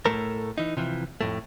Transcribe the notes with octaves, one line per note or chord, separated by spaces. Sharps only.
A2 A3 A4 A#4
E3 D#4
C3 E3 F3
F2 A2 A3